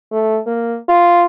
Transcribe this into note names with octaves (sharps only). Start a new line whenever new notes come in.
A3
A#3
F4